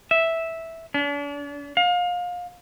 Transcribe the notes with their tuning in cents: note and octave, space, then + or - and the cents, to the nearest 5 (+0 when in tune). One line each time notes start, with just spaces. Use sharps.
E5 -5
D4 -40
F5 +30